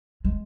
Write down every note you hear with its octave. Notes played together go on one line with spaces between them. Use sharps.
G#3